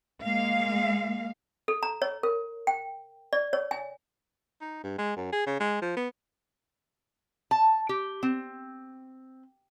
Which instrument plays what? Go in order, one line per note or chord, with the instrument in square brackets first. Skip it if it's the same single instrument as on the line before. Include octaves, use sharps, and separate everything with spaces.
[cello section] G#3 A#3 F5
[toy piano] A4
A#5
C#5
A#4
G5
D5
C#5
G#5
[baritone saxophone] D#4
G2
G#3
F#2
G#4
C#3
G#3
F3
B3
[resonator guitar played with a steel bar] A5
G4
C4